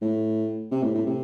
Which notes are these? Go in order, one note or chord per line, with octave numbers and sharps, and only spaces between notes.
A2
C3
A2
A2
C3